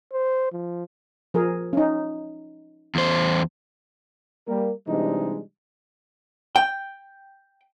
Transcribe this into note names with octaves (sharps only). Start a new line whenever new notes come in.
C5
F3
F3 G#4 A#4
C#4 D#4
E2 C5
G3 A#3 A#4
C3 E3 G3 G#3 D4 D#4
G5